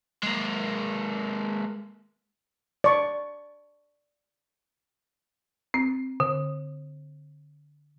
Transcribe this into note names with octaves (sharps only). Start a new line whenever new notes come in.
G#3 A#3
D5 C#6
C4
D3